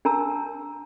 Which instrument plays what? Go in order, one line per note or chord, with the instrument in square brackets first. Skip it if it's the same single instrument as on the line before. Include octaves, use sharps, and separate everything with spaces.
[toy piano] D4 A#4 A5 A#5 E6